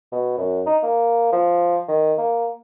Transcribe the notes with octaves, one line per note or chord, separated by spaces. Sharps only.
B2
F#2
D#4
A#3
F3
D#3
A#3